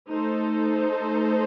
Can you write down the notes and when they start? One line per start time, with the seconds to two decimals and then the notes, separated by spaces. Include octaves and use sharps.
0.11 A3 D#4 A4 C5